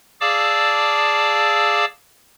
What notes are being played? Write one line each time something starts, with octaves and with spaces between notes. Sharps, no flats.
G#4 D5 F5 A5 D6 E6